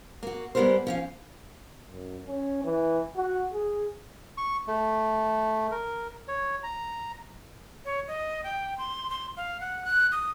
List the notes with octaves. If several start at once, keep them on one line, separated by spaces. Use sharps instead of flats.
A#3 F#4
G3 G#3 B3 F4 A#4 C5
F3 C#4 F5
F#2
C#4
E3
F#4
G#4
C#6
A3
A#4
C#5
A#5
C#5
D#5
G5
C6
C6
F5
F#5
F#6
D#6